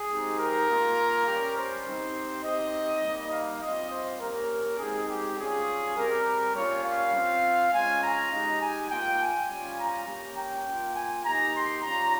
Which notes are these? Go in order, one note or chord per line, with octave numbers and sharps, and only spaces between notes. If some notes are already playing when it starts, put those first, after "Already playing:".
Already playing: G#4
G#3 C4 D#4 G4
A#4
A#3 F4
G3 C#4 G4
C5
C4 D#4 G4
C4 D#4 G4 D#5
G3 A#3 D#4
F5
G3 C4 F4 D#5
C5
A#3 C#4 G4 A#4
G#3 C4 D#4 G4 G#4
G4
G3 C#4 F4 G#4
G3 C4 G4 A#4
G3 A#3 C#4 F4 C#5
F5
C4 F4
G#3 C#4 F4 G#5
A#5
G#3 D#4 G4
G#5
A#3 F4 G5
G#5
G3 C#4 F4
A#5
A#3 C#4 G4
G5
A#3 F4
G#5
A#3 D#4 G4 A#5
C6
G3 C#4 F4 A#5